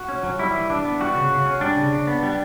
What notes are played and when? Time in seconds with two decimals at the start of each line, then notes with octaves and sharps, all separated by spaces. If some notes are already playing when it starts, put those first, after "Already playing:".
Already playing: F#4
0.09 C#4
0.23 F#3
0.39 G3 E4
0.54 E3
0.69 E3 D4
0.85 B3
1.00 G3 F#4
1.15 C#3
1.31 C#3
1.46 C#4
1.61 G3 D4
1.77 C#3
1.92 C#3
2.07 B3
2.23 G3